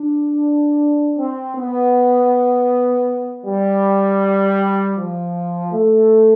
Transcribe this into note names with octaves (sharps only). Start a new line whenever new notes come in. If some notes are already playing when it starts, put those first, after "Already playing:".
Already playing: D4
C4
B3
G3
F3
A3